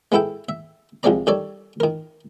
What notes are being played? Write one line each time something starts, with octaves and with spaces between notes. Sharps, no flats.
G#3 B3 E4 A4 G5
E5
C2 F3 G#3 C4 D5 A#5
D#3 G3 A4 C#5 D5
D#3 A#4